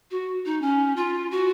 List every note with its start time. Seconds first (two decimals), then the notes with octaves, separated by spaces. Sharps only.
0.11 F#4
0.46 D#4
0.62 C#4
0.97 F4
1.31 F#4